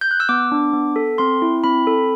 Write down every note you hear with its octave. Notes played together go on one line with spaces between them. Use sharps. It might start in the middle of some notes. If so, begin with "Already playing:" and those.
G6
F#6
E6
B3 D6
D4
B3
A4
C4 C6
E4
C4 B5
A4